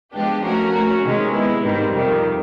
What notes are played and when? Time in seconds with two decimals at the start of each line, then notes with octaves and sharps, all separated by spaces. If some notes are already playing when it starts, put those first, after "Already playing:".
0.13 F3 G#3 B3 D4 G4
0.44 A3 C#4 F#4 A#4
0.74 A3 C#4 F#4
1.04 C3 D#3 G#3 C#4
1.33 G#3 B3 E4
1.63 G#2 D#3 G3 C4
1.93 F2 C3 D#3 G3